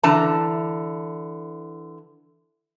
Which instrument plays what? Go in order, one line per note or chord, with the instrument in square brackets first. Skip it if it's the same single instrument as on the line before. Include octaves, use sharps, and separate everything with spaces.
[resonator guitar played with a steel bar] D3 E3 A5 A#5